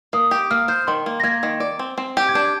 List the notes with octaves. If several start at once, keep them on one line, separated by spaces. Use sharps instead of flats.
A#3 D#6
G4
A#3 F6
C5 G6
D#3 C6
A#3
A#6
A#3 G#6
D#3
D5
C4
C4
G4
G#6
D4 G6